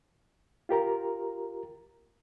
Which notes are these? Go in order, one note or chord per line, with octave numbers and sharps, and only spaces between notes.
F4 G4 A#4 A#5